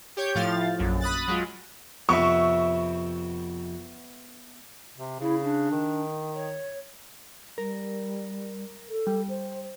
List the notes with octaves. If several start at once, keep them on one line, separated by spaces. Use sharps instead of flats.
G4 C#5 G6
A2 F3 F5 A6
A#1 F#2
B5 D#6 F#6 A6
F#3 G#3 F4
F2 C3 B3 C4 E5 C#6
C3
C#3 E4
D4
D#3
C#5
G3 A#4
A4
G3
C5